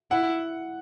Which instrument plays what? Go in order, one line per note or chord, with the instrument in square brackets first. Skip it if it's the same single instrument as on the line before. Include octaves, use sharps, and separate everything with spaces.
[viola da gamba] E4 [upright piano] F#5